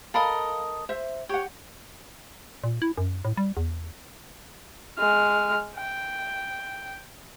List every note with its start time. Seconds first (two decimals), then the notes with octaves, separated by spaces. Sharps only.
0.14 A4 A#4 D#5 F5 B5
0.89 C5 E5
1.29 G4 C#5 F#5
2.64 A#2
2.82 E4
2.98 F#2
3.25 A2
3.37 G3
3.57 E2
4.99 G#3 F6
5.76 G5